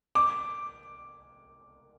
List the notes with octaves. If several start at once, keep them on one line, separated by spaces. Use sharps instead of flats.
D6